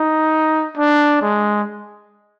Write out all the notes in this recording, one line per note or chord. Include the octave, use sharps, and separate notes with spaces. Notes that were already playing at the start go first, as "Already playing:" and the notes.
Already playing: D#4
D4
G#3